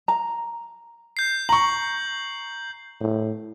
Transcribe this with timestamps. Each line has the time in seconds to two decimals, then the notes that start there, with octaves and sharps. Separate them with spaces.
0.08 A#5
1.17 G6 C7
1.49 A#5 C#6 F#7
3.00 A2